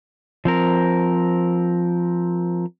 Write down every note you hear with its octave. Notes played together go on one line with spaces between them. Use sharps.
F3 C4 A#4